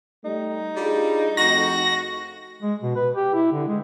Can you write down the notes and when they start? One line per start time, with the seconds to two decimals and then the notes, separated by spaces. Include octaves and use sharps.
0.25 G3 A3 D#4
0.76 G3 D4 F4 G#4
1.37 F2 A3 F#4 A#6
2.62 G#3
2.83 B2
2.96 B4
3.15 G4
3.34 E4
3.53 D3
3.68 G#3